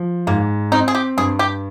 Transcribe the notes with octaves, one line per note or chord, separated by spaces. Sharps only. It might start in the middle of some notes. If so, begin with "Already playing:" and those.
Already playing: F3
G#2 A#3
C4 D#4
G#4
G4
G2 G#4
G4